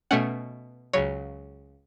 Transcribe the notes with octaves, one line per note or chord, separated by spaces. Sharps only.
B2 A3 C#4 F#5
C#2 C#3 F#3 C#5